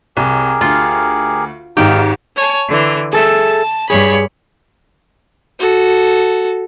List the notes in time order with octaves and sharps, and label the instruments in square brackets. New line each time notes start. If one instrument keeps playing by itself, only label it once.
[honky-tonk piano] C2 [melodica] G4 G#4 A#4
[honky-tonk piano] D2 [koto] F4
[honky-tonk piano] G#1 G#2 D#3 [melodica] D#4 F4 [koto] G4
[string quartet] C#5 G#5 A5
D3 E3
[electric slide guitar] G#4 A4 E5 [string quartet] A5
[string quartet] G2 C#5 B5 [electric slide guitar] G#4
[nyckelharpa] F#4 A4